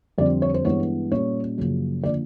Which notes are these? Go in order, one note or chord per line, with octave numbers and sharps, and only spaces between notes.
F2 D3 G3 C4 D5
C#5
C5
G2 E3 G#3 B3 C#5
A#2 G3 A#3 C#4 C#5
F#2 C#3 F3 A#3
D3 F3 A#3 D5